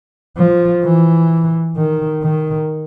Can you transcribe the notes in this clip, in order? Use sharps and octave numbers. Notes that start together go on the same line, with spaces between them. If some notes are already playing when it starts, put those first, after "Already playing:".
F3
E3
D#3
D#3